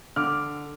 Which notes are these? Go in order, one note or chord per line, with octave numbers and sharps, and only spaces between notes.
D3 D6 F6